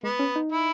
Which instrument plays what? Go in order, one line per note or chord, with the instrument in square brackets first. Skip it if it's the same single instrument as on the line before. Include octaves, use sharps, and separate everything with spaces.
[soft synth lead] G#3 [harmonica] B3
[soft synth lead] C#4
D#4
[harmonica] E4